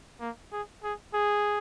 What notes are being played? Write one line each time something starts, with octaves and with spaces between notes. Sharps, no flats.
A#3
G#4
G#4
G#4